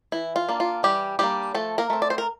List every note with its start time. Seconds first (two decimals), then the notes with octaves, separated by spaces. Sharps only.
0.12 E3 E4
0.36 F4
0.49 A#3 D4
0.60 F4
0.83 E3 G3 G4
1.19 G3 A#3 D4 G4
1.55 F3 A3 A4
1.78 A#3 A#4
1.90 A3 C4
2.02 D5
2.10 C5
2.18 A#4